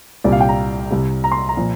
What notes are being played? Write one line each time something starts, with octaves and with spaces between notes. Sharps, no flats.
C2 A#2 G3 D5
F5
G5
A#5
C2 C3 G3
A#5
C6
A#5
A#2 F3